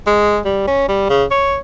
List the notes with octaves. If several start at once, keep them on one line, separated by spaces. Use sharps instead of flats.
G#3
G3
C#4
G3
C#3
C#5